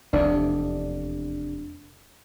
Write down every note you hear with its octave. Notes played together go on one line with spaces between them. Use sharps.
F1 E2 C3 D4